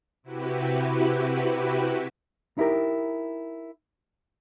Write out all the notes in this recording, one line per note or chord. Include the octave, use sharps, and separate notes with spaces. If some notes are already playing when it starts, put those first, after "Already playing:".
C3 E4 F#4 G4 B4
D#4 E4 G4 A#4